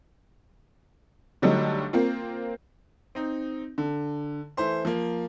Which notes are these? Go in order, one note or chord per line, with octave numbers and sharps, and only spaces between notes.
D3 F#3 G3 A3 D#4
A#3 C4 F4
C4 D#4
D3
E3 A3 C5 C6
F3 A#3